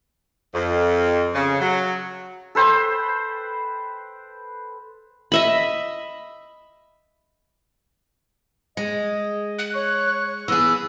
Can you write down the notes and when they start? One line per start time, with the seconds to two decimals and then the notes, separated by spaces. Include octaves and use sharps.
0.54 F2
1.34 C#3
1.61 F#3
2.55 A4 B4 C5 G5
5.32 D#5 E5 B5
8.77 G#3 D#5
9.59 F#6
9.75 C#5 C#6
10.48 E3 B3 G#4 E6